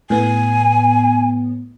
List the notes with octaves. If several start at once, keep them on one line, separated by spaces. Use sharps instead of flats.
A2 B3 G#5